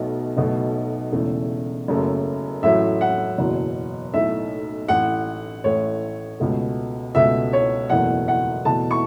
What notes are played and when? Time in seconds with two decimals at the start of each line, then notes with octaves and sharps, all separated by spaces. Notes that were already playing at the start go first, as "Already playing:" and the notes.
Already playing: B1 B2 A3
0.37 B1 B2 A3
1.12 E1 E2 C#3 A3
1.88 F#1 F#2 C#3 A3
2.63 A1 A2 F#3 A3 E5
3.01 F#5
3.38 F#1 E2 B2 F#3
4.14 B1 A2 A3 E5
4.88 A1 A2 A3 F#5
5.64 A1 A2 E3 A3 C#5
6.40 C#2 B2 A3
7.15 C#2 B2 A3 E5
7.53 C#5
7.90 F#1 E2 B2 A3 F#5
8.28 F#5
8.65 E2 B2 A3 A5
8.91 C#6